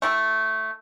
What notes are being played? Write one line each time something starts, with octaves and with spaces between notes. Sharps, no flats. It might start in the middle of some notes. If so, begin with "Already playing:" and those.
A3 E4 G4